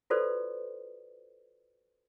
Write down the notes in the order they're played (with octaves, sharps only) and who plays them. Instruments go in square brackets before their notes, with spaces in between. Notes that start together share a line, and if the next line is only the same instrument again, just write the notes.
[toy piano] F4 F#4 A4 B4 C5 D5